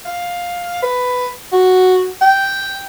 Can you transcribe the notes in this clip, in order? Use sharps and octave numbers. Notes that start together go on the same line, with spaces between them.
F5
B4
F#4
G5